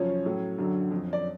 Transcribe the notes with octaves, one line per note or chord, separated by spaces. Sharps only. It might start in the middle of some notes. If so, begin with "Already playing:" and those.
Already playing: F#2 C#3 F3 C#4 C#5
A2 F#3
F#2 D3 F#3
F2 F3
D5